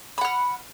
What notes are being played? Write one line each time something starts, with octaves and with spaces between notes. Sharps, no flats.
F#5 B5 F6